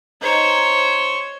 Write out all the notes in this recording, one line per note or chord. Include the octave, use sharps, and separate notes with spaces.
D#4 C5 C#5